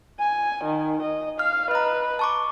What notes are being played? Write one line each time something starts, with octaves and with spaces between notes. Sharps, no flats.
G#5
D#3
D#5
F5 F6
B4 D#5 A#5
A5 C#6 D6